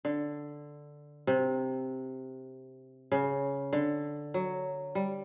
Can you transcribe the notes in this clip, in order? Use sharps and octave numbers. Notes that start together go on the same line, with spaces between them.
D3
C3
C#3
D3
F#3
G3